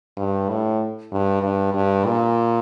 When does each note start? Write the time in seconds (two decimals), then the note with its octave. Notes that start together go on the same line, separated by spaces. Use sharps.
0.17 G2
0.49 A2
1.12 G2
1.43 G2
1.74 G2
2.05 A#2